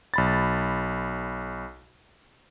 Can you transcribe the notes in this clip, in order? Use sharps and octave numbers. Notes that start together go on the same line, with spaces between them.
B1 B5 A6